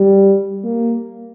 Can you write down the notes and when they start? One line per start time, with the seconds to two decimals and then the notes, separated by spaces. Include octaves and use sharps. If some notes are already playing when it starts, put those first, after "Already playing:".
Already playing: G3
0.64 A#3